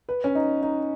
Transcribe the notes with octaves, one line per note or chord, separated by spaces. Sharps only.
B4
C#4
D#4
D#4